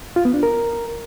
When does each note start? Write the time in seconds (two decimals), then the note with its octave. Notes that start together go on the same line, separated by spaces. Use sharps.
0.16 F4
0.25 B3
0.34 D4
0.43 A#4